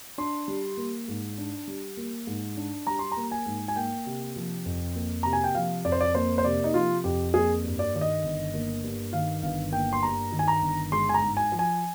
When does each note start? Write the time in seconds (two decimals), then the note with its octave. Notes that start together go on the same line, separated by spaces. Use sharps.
0.18 D4 C6
0.48 G3
0.77 A#3
1.08 G#2
1.38 D4
1.67 G3
1.97 A#3
2.27 G#2
2.57 D4
2.87 G3 A#5
2.99 C6
3.12 A#5
3.17 A#3
3.31 G#5
3.46 G#2
3.68 G#5
3.76 A#3 G5
4.06 C3
4.36 F3
4.65 F2
4.95 A#3
5.23 C3 A#5
5.33 G#5
5.44 G5
5.55 F3 F5
5.85 F2 D5
5.92 C5
6.01 D5
6.15 A#3 C5
6.38 C5
6.44 C3 D5
6.64 D#4
6.74 F3 F4
7.04 F2 G4
7.34 A#3 G#4
7.64 G2
7.79 D5
7.94 D#3 D5
8.01 D#5
8.24 G1
8.54 A#3
8.83 G2
9.13 D#3 F5
9.43 G1 F5
9.72 A#3 G5
9.93 C6
10.03 G2 A#5
10.32 D#3
10.39 G#5
10.48 A#5
10.62 G1
10.92 G#3 C6
11.09 G#5
11.14 A#5
11.22 G#2
11.37 G#5
11.52 F3
11.59 G#5